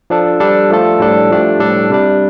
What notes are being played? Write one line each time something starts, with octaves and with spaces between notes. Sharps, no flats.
F3 D4 A4
G3 D4 A4
F3 A3 F4 A4
A2 G3 D4 A4
F3 A3 D4 G4
A2 G3 D4 A4
C3 G3 D4